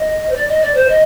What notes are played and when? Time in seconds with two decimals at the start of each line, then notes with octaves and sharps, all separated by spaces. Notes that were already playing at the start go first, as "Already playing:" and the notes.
Already playing: D#5
0.29 C5
0.34 D5
0.47 D#5
0.61 D5
0.74 C5
0.88 D#5